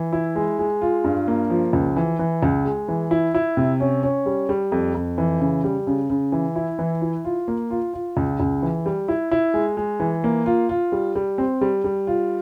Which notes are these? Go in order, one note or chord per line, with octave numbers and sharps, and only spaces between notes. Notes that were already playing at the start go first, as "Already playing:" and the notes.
Already playing: E3
E4
G#3
G#3
F4
G2
A#3
F3
C#2
E3
E3
C#2
G#3
E3
E4
E4
C3
C#4
C#4
G3
G3
F2
F2
E3
C#3
G3
C#3
C#3
E3
E4
E3
E4
F4
A#3
F4
F4
C#2
C#2
E3
G3
E4
E4
G#3
G#3
E3
A#3
F4
F4
G3
G3
C4
G3
G3
F4